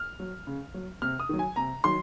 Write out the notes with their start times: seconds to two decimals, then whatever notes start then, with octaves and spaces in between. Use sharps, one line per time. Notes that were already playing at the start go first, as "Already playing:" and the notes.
Already playing: F6
0.20 F#3
0.47 C#3
0.74 F#3
1.02 C3 F6
1.20 D#6
1.29 D#3 F#3
1.39 G#5
1.56 C3 A#5
1.84 D#3 F#3 C6